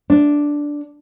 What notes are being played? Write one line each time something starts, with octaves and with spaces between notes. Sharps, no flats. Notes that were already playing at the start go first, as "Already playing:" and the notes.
D4